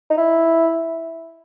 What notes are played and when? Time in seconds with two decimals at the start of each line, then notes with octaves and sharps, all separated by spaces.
0.10 D#4
0.17 E4